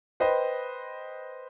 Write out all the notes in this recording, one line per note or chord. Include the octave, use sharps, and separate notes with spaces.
B4 C5 D#5 G5 B5